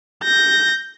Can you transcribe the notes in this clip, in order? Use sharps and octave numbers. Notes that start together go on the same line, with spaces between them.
G6 A#6